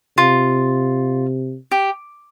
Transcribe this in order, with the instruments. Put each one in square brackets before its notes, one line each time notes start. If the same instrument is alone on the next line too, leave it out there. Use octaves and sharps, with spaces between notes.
[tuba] C3 [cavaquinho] F4
[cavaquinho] G4